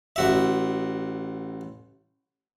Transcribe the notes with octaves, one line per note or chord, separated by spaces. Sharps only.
A1 F#4 E5